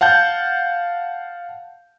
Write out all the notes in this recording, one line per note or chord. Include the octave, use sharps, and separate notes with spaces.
F5 F#5 A5 G6